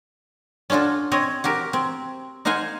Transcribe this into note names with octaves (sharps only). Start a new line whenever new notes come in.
C#4 D4 F4 F#4 A4
C4 C#5 D#5
F#4 G4 A#4
C4
D#4 C5 F5 F#5 G#5